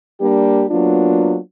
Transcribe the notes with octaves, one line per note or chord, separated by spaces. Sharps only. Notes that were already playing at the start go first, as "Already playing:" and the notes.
G3 A#3 D4 G4
F#3 A#3 B3 D4 F4